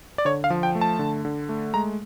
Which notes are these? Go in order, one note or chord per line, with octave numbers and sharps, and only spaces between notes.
D5
D3 C#5
F5
F3
G5
A3
A5
D3
D3
A3
G#3 A#5